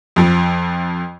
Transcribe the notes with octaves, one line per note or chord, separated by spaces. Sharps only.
F2 F3